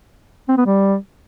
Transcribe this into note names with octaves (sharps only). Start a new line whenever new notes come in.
C4
B3
G3